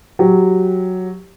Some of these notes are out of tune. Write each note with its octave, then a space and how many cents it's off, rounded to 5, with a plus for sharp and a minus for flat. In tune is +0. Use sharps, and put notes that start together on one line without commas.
F#3 +0 G4 +0